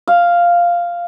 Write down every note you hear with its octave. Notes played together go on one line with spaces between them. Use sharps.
F5